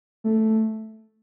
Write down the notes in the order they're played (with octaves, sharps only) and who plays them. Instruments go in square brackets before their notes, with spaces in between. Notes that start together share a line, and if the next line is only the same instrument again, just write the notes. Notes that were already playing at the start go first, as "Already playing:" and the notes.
[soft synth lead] A3